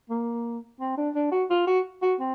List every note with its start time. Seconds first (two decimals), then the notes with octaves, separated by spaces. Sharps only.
0.10 A#3
0.80 C4
0.97 D4
1.15 D4
1.32 F#4
1.50 F4
1.67 F#4
2.02 F#4
2.20 C4